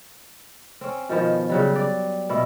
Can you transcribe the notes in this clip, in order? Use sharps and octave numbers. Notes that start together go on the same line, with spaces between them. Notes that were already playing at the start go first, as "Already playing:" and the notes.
C4 C#4
B2 D#3 F3 B3
C#3 F#3 G3
D5
B2 E4